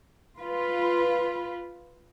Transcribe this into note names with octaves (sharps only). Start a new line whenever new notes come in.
F4 B4